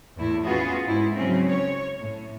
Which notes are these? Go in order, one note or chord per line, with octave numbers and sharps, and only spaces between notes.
E2 A2 E4
B3 C#4 F4 F#4 G#4 B4
G#2 E4
C#3 F#3 G#3 C4 C#4
C#5
A2